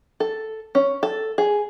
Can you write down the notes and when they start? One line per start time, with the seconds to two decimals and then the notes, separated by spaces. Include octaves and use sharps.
0.20 A4
0.75 C#4
1.03 A4
1.38 G#4